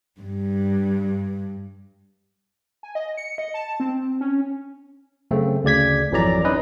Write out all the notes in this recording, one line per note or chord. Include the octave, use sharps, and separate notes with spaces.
G2
G#5
D#5
C#7
D#5
A5
C4
C#4
F#2 C#3 A3 C4
D2 C#3 D5 G#6 B6
G#1 F2 E3 F#3 D5 A#5
C#4 D#4 B4 D#5